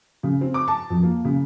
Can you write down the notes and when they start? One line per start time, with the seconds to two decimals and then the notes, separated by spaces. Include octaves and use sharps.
0.23 C#3
0.41 C4
0.54 D6
0.68 A5
0.90 F2
1.03 A#3
1.25 C#3